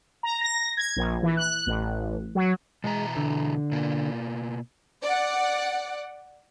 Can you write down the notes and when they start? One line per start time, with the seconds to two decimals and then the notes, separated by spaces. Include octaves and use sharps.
0.23 A#5
0.41 A#6
0.77 G#6
0.96 A#1
1.23 E3
1.37 F#6
1.67 A1
2.35 F#3
2.84 B2 E3 G#3 A#5
3.17 D3
3.72 B2 A#3
5.03 D5 F#5